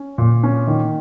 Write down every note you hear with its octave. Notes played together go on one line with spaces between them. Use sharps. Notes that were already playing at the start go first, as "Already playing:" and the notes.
Already playing: C#4
A#2
C#4
D#3